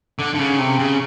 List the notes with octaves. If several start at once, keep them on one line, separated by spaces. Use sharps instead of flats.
D3
D3
C#3
C3
C#3